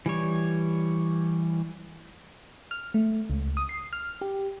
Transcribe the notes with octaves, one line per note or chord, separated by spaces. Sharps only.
E3 G3 C#5
F6
A3
C#2
D#6
C7
F6
G4